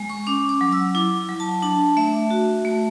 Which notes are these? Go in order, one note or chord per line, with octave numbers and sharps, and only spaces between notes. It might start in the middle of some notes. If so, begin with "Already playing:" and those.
Already playing: G#3
C#6
C#4 D6
D6
F#3
E6
E4 D6
F#3
A5
D4 A5
A3 E5
F#4
A3